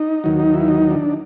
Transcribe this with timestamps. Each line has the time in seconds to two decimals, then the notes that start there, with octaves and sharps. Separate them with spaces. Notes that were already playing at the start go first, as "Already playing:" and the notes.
Already playing: D#4
0.24 D#2 D#3 F#3
0.40 D#4
0.54 E4
0.68 D#4
0.91 D4